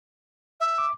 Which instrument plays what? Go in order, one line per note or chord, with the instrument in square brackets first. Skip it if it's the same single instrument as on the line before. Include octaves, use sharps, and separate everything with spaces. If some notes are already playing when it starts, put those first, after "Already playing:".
[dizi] E5
[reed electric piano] D6